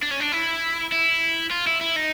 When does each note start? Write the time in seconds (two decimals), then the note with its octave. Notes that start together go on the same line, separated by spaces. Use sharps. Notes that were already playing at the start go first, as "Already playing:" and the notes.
0.03 D4
0.11 C#4
0.20 D4
0.32 E4
0.92 E4
1.51 F4
1.67 E4
1.81 E4
1.96 D#4